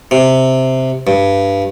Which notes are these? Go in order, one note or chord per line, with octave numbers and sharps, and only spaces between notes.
C3
G2